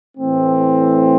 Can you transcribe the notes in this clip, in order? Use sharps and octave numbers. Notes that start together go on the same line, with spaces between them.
A2 E3 A3 C4